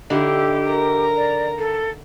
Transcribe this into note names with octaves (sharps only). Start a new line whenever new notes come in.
D3 D#4 E4 G4
A#4 A#5
D5
A4